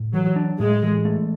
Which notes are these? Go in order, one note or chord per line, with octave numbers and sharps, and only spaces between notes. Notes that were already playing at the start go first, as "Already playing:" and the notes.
Already playing: A2
E3 F#3
D4
A2 G#3
E3
A3